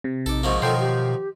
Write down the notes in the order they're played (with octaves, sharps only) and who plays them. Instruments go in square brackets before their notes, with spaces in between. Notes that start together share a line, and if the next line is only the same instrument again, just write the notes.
[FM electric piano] C3
[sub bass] A#1 [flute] D#4 [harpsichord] A4 D6
[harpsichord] G#2 F3 A#3 [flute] C#6
[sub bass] B2 [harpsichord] D#3 F3 F#3 [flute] A4 [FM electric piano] G5 C6
[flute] G4